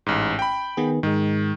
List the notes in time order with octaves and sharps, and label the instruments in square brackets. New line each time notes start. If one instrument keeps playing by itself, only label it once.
[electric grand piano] A1 G#2
G5 B5
[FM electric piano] D#3 B3 G#4
[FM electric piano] G#2 G#3 [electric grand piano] D#3